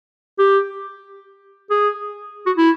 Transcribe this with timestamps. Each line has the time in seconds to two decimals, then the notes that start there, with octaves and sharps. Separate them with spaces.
0.39 G4
1.70 G#4
2.46 F#4
2.57 E4